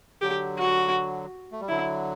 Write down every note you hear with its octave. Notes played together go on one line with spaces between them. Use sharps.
D3 F#3 G4
F#4
A3
G3
D3 F#3 E4